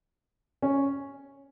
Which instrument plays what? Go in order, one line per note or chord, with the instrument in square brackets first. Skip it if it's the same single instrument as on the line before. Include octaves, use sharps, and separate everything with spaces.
[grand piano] C#4